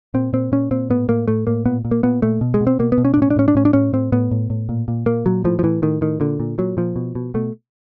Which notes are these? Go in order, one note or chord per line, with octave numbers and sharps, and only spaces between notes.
A#2 C4
A#2 C4
A#2 C#4
A#2 C4
A2 B3
A2 A#3
A2 A3
A2 A#3
A#2 B3
A#2
A#3
A#2 B3
A#2 A3
B2
G#3
B2
C4
B2 A#3
B3
B2
C#4
D4
A2 C#4
D4
A2 C#4
D4
A2 C#4
D4
A2 C#4
A2 C4
A2 B3
A2
A2
A#2
A#2
A#2 A#3
A#2 F#3
A2 F3
F3
A2 E3
A2 D#3
A2 D#3
A#2 D3
A#2
A#2 F#3
A#2 F3
B2
B2
B2 A3